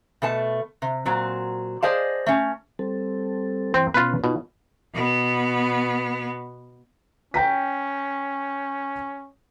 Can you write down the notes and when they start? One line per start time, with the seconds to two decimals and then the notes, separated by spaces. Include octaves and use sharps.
0.22 B2 A3 A5
0.82 C3
1.05 A#2 F#3 C4
1.82 G#4 C5 D5 D#5 F5 A5
2.26 A3 C#4
2.79 G3 C4 A4
3.74 G2 E3 C4
3.94 B2 B3 C#4 F4 B4
4.24 B2 D#4 F4
4.94 B2 B3
7.34 C#4 G5 A#5 B6